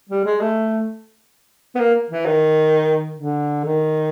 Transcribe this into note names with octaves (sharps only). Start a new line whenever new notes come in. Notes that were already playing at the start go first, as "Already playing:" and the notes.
G3
G#3
A3
B3
A#3
E3
D#3
D3
D#3